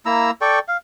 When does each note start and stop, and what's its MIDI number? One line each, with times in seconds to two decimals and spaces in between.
0.06 0.31 58
0.06 0.31 64
0.06 0.31 82
0.06 0.31 88
0.41 0.59 69
0.41 0.59 74
0.41 0.59 79
0.41 0.59 85
0.68 0.77 77